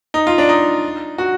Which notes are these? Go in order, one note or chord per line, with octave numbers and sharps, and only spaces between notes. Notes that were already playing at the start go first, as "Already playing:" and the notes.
D#4
F4
D4
D#4
F#4